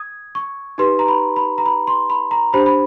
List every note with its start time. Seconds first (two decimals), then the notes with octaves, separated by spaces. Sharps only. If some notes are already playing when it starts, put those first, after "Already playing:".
Already playing: D#6 G#6
0.35 C#6
0.78 D#4 G4 B4 C6
0.99 A#5
1.08 B5
1.36 B5
1.58 A#5
1.66 B5
1.87 C6
2.10 B5
2.31 A#5
2.53 D4 G4 C5 B5
2.66 B5